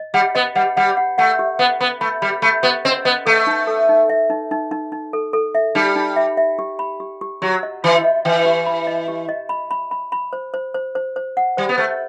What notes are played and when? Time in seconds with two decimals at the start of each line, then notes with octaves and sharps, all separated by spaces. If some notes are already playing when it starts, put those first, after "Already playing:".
Already playing: D#5
0.14 G3 F#5
0.35 B3 D#5
0.55 G3 F#5
0.77 G3 F#5
0.97 F#5
1.18 A3 F#5
1.39 G4
1.59 B3 F#5
1.80 B3 B5
2.01 A3 B5
2.22 G3 B5
2.42 A3 B5
2.63 B3 G4
2.85 C4 D#5
3.05 B3 D#5
3.26 A3 A4
3.47 D#4
3.67 A4
3.89 D#4
4.10 E5
4.30 D#4
4.51 D#4
4.71 D#4
4.92 D#4
5.13 A4
5.33 A4
5.55 E5
5.75 G3 D#4
5.96 D#4
6.16 E5
6.37 E5
6.59 G4
6.79 B5
7.00 G4
7.21 G4
7.42 F#3 G4
7.63 D#5
7.84 E3 B5
8.04 D#5
8.25 E3 G5
8.46 G4
8.66 B5
8.87 D#5
9.08 G4
9.29 D#5
9.49 B5
9.71 B5
9.91 B5
10.12 B5
10.33 C5
10.54 C5
10.74 C5
10.95 C5
11.16 C5
11.37 F#5
11.57 G3 C5
11.69 B3
11.78 A3 C5